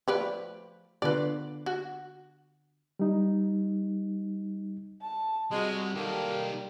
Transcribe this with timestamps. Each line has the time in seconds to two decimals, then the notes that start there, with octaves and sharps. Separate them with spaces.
0.08 F3 A3 B4 D5
1.02 D3 B3 F4 B4 D5
1.66 F#4
2.99 G3 D#4
5.02 A5
5.51 G3 G#3 C4 F#4
5.95 D#3 G3 A#3 D#4 A4